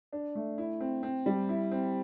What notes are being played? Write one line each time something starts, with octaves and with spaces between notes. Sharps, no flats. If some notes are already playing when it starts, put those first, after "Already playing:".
D4
A3
E4
C4
C4
G3
E4
C4